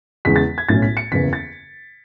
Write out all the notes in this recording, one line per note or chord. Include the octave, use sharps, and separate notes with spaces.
E2 C#3 G#3 B6
A6
G#6
B1 A2 F#3 C#4 A6
B6
C#7
F#1 E2 C#3 E3 B6
A6